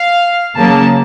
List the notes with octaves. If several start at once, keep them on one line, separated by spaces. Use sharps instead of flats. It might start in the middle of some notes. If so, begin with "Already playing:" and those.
Already playing: F5
C#3 F#3 A#3 A5